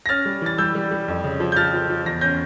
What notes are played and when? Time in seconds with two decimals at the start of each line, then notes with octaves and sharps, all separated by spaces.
0.06 A#6
0.09 C#4 F6 A6
0.25 G3
0.42 E3 A6
0.58 G3 E6 G6
0.75 G3
0.91 G3
1.08 F2
1.24 C#3
1.40 F3
1.52 G6
1.56 F3 F6 A6
1.73 F3
1.89 F3
2.06 E2 A#6
2.21 C#4 G6 A#6